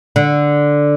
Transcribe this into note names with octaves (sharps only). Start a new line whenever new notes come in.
D3